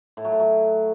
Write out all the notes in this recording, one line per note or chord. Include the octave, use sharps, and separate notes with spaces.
A2
F#3
A2
F#3